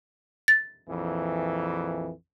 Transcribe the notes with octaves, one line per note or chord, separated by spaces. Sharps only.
A6
A#1 F2 E3